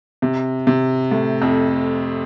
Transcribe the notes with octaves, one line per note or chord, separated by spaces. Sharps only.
C3
C3
A2
F2